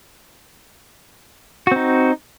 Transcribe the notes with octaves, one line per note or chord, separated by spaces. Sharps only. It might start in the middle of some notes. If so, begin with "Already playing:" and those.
C4 D#4 F#4